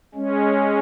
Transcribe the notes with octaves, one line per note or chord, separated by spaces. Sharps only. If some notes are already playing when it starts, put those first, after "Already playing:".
G#3 C#4